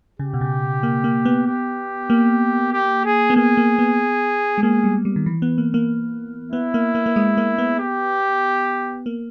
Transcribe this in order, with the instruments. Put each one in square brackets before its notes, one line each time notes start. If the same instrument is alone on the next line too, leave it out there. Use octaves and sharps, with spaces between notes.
[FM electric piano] C#3 [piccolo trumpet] G4
[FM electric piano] B2
C#3
A#3
A#3
B3
[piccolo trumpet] G4
[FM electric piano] A#3
[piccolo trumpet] G4
G#4
[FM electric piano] B3
[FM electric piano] A#3 [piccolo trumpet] G#4
[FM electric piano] A#3
B3
G#3
[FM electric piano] A#3 [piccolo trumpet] G#4
[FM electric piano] G3
G3
D#3
E3
B3
A#3
A#3
[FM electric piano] B3 [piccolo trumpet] E4
[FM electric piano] A#3
A#3
A#3
G#3
A#3
B3
[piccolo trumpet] G4
[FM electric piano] A#3